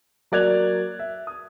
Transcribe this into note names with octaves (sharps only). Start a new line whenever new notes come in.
F#3 A#3 D5 F#6 G#6 F7
E5
D#6